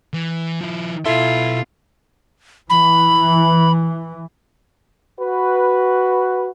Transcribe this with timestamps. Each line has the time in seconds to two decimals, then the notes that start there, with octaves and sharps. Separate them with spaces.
0.13 E3
0.61 F3 E4
1.05 B2 E4 F4 A4 E5 C6
2.70 E3 B5
5.19 F#4 B4